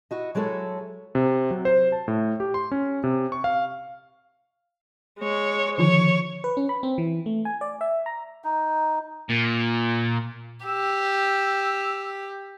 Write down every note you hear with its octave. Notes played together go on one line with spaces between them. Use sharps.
E4 F#4 D#5
F#3 G#3 E4 A4 C#5
C3
F#3
C5
A5
A2
G4
C6
C#4
C3
C#6
F5
G#3 C#5
D3 D#3 F3 C#5
B4
C#4
B5
C4
E3
A3
G#5
D5
E5
A#5
D#4
A#2
G4 E6